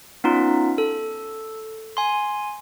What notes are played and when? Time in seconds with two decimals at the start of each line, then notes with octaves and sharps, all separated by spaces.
0.24 B3 C#4 D#4 F4
0.78 A4
1.97 G#5 C6